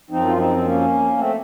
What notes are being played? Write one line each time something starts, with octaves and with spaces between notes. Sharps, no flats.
F#2 F3 C4 D#4
F4
C4 D#4
D#4
A#3 C#4
A3 C4